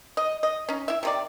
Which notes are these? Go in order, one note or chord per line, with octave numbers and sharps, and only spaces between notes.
D#5
D#5
C#4 D#4
E4 E5
C3 D#3 D5